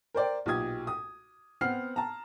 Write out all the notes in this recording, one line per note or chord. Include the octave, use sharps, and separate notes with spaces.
A#4 C5 D5 G5
B1 A#2 G4 D#6 G#6
D#6
B3 C4 F#5 F6 C7
A5 A#5